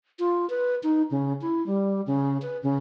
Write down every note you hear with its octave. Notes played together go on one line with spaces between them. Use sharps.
F4
B4
D#4
C#3
E4
G3
C#3
B4
C#3